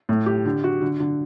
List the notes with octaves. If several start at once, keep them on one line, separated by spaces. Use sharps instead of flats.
A2
G4
D3
F#4
D3
D3